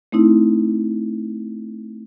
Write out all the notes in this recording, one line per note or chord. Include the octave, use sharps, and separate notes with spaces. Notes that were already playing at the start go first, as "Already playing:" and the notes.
A3 C4 D#4 E4